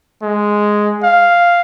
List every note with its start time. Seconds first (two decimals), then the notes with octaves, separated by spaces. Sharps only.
0.23 G#3
1.03 F5